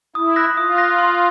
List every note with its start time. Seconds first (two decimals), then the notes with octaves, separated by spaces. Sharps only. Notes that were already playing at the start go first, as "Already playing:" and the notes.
0.15 E4 D#6
0.36 F#6 A#6
0.57 F4 D#6
0.77 F#6 A#6
0.99 C6